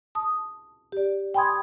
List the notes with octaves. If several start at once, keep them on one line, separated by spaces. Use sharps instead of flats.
A5 D#6
G4 D5
G5 G#5 B5 C6 D#6 G#6